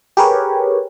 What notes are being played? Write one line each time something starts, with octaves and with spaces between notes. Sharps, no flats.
G4 G#4 A#4 B4 C#5